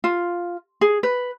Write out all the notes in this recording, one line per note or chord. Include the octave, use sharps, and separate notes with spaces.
F4
G#4
B4